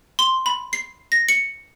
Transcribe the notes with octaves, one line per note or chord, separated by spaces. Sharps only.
C6
B5
C7
A#6
C#7